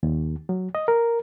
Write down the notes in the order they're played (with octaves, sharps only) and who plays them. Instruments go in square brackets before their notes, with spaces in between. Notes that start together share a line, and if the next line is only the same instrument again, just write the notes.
[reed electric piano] D#2
F#3
D#5
A#4